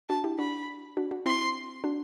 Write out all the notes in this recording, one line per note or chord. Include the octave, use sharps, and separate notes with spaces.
D4 F#4 A5
E4 G4
D4 F#4 B5
D4 F#4
D4 F#4
C4 E4 C6
D4 F#4